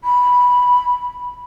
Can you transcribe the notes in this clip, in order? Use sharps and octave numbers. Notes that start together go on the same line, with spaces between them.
B5